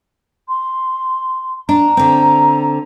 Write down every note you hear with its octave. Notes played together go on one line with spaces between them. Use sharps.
C6
D4 A#5
D3 C4